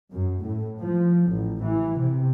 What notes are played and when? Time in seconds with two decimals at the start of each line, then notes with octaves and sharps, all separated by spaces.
0.13 F#2
0.44 A2
0.80 F3
1.31 A1
1.65 E3
2.00 C3